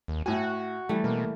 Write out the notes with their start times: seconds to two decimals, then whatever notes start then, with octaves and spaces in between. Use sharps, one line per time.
0.08 D#2
0.26 A2 F#4 G#5
0.89 E3 G3 A3
1.04 B2 A#3